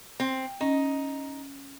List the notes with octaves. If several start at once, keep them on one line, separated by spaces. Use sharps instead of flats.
C4
C#4 D#4